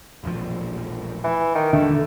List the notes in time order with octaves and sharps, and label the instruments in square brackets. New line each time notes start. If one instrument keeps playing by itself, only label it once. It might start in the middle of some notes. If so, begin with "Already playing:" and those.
[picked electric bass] E1 A#1 F3
[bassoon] E3
D#3
[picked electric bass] D#1 [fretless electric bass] D3 [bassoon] A3